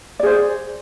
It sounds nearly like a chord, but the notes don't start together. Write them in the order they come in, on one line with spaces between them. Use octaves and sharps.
D5 G#4 C5